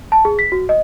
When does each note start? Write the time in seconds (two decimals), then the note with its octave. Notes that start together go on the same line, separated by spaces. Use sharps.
0.12 A5
0.25 G#4
0.39 B6
0.52 F#4
0.69 D#5